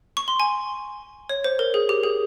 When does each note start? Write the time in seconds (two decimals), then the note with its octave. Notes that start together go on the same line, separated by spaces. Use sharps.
0.17 C#6
0.28 C6
0.40 G#5
1.29 C#5
1.44 C5
1.59 A#4
1.74 G#4
1.89 G4
2.03 G#4